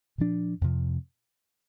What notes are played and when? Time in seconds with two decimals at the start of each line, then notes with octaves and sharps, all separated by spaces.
0.18 A#2 F3 D4
0.61 F2 C3 F3